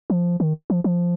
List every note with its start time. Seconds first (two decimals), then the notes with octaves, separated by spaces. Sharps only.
0.10 F3
0.40 D#3
0.70 F3
0.84 F3